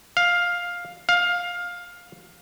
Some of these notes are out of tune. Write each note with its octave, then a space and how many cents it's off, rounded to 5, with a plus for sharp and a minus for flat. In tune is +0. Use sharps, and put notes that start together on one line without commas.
F5 +10
F5 +15